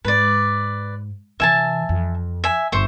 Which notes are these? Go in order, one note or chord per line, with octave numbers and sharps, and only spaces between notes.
G#2 B4 D5
C3 E3 E5 G#5 A5
F2
E5 G#5
G1 C5 E5 C#6